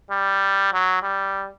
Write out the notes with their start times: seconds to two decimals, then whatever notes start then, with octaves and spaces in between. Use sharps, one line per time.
0.11 G3
0.74 F#3
1.03 G3